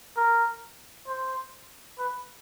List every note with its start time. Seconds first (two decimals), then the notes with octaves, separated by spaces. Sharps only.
0.17 A#4
1.08 C5
1.99 B4